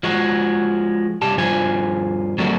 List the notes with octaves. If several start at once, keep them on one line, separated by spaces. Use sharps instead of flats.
F3 G#3 F#4
C2 G4 A5
G2 F3 F4 C5 G#5
F#3 G3 A3 A#3 C4 F#4